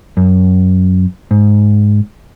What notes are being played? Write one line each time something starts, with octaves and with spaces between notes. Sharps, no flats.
F#2
G#2